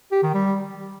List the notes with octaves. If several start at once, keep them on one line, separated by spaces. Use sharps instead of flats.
G4
D#3
G3